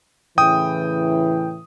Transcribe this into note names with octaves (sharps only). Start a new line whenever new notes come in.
A2 C#3 E3 G5 D#6